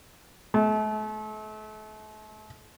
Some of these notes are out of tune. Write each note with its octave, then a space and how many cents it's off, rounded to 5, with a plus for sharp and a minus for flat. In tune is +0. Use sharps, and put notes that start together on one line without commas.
A3 -40